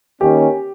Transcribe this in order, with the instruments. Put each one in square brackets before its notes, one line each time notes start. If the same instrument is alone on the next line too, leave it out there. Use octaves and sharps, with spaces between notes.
[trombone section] D#3 A#3 C#4 [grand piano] G4